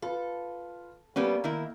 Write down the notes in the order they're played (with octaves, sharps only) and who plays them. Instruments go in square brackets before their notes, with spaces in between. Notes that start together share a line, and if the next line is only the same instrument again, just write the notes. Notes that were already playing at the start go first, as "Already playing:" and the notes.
[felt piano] F4 B4 [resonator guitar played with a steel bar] A4
[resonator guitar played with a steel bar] G3 B3 C#4 [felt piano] A#3 A4
[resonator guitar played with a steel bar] D#3 E4 A#4